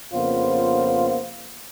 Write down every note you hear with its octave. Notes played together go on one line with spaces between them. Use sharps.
F2 C#3 A#3 B3 F4 C5